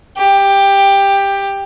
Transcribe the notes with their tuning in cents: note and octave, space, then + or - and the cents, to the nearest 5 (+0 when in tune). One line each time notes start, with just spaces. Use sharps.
G4 +10